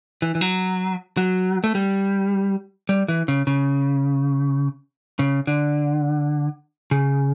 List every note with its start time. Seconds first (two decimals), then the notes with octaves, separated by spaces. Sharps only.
0.22 E3
0.35 E3
0.41 F#3
1.17 F#3
1.64 A3
1.75 G3
2.89 G3
3.08 E3
3.28 C#3
3.47 C#3
5.19 C#3
5.47 D3
6.91 C#3